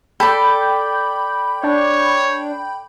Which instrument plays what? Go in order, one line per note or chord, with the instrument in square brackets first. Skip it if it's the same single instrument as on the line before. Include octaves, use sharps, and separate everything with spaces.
[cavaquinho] A4 D5 [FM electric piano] G5 B5 G6
[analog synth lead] D4 [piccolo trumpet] C#5